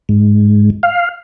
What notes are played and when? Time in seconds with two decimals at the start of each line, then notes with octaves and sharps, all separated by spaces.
0.09 G#2
0.83 F5